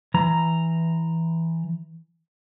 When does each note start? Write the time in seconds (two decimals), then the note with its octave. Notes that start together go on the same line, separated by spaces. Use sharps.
0.14 E3 A#5